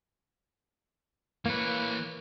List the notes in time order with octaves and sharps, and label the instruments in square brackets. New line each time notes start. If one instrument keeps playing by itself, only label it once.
[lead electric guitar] E3 C#5 [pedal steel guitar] A#3 B4